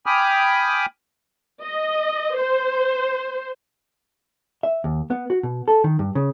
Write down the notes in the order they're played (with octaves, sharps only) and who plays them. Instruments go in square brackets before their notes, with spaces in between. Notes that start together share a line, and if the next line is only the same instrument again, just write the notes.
[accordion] G5 G#5 B5 D6 D#6 F6
[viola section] D#5
C5
[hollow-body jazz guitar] E5
D#2
B3
F#4
B2
A4
D#3
G2
C#3